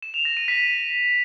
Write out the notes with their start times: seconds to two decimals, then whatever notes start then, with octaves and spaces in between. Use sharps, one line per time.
0.03 E7
0.14 F7
0.25 A#6
0.37 D#7
0.48 B6